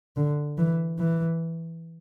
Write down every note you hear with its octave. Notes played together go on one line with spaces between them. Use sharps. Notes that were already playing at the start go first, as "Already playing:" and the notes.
D3
E3
E3